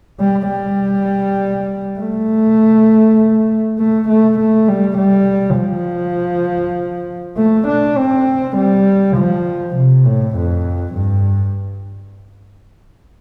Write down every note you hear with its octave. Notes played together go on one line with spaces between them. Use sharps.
G3
G3
A3
A3
A3
A3
G3
G3
F3
A3
D4
C4
G3
F3
C3
A2
F2
G2